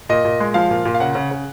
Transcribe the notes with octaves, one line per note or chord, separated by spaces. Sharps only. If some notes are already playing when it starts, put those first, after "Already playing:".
A#2 D#5
A#2
G#3
F3 F5
A#2
A#2
F5
C#3 F#5
C#3
C#3